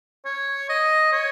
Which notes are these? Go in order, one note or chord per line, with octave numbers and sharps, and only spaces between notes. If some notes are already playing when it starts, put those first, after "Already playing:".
C#5
D#5
C#5